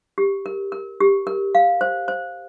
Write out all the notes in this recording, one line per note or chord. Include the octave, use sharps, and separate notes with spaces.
G4
A#4
A#4
G4
A#4
F5
C5
C5